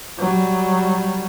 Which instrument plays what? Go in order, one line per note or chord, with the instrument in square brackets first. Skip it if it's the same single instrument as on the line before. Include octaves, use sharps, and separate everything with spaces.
[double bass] F#3 G3